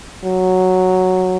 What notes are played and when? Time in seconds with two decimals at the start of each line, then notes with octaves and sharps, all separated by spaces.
0.23 F#3